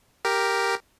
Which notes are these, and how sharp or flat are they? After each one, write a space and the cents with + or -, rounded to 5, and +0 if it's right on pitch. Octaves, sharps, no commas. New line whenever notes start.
G4 +0 A#4 +0